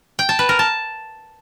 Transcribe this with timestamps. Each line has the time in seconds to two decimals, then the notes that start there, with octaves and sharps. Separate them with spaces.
0.19 G5
0.29 A5
0.39 B4
0.49 A#4
0.59 A5